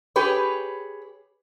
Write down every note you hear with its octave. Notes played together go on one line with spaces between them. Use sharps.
G4 G#4 B4 C#5